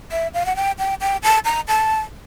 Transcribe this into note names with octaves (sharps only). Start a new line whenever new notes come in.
E5
F5
F#5
G5
G5
G5
A5
A#5
A5